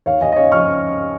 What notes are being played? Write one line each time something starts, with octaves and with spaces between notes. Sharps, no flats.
D#2 C#5 F5
D#2 D#5 G#5
D#5
C#3 C#5 F5
F3 C#6 F6